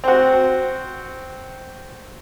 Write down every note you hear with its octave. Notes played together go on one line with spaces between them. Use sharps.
C4 F#4